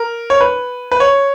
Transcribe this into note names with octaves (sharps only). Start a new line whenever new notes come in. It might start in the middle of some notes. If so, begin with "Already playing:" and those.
Already playing: A#4
C#5
B4
B4
C#5